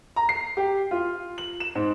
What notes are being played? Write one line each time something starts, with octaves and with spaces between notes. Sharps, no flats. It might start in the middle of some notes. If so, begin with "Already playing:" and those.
A#5
C7
G4
F4
F#7
E7
G#2